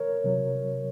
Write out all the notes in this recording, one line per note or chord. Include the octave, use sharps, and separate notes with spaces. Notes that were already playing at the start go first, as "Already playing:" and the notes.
Already playing: A#4 C#5
C3 F#3